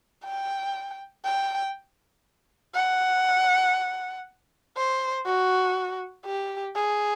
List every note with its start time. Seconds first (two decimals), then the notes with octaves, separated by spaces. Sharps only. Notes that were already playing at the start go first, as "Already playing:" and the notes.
0.24 G5
1.25 G5
2.76 F#5
4.76 C5
5.26 F#4
6.26 G4
6.76 G#4